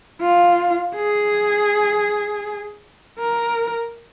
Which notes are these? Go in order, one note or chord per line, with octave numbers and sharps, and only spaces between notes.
F4
G#4
A#4